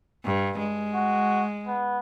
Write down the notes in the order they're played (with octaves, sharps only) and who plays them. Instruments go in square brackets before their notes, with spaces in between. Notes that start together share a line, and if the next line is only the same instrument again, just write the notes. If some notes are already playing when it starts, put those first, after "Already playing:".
[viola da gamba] G2
G#3
[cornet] F#4
B3